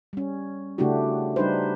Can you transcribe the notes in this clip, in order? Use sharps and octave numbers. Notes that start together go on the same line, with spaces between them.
G3 C#4
C#3 A3 D4 E4 F#4 G4
G3 D4 D#4 G4 B4 C5